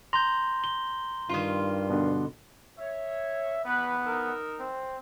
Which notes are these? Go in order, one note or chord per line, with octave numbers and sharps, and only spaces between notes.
A#5 C6 G6
G7
G2 D#3 F4
B2 D3
C#5 E5
B3 B4
D#4 A#4 E6
C4